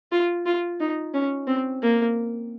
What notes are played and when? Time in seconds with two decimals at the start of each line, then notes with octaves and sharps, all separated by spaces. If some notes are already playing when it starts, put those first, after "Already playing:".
0.12 F4
0.46 F4
0.80 D#4
1.14 C#4
1.47 C4
1.82 A#3